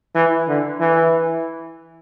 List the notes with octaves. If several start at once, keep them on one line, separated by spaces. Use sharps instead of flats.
E3
D3
E3